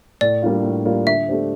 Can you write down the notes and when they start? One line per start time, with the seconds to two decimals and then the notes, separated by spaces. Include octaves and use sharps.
0.21 A2 D5
0.42 G3 A#3 D4 F4
0.63 A2
0.85 G3 A#3 D4 F4
1.06 D3 E5
1.28 A3 D4 G4 C5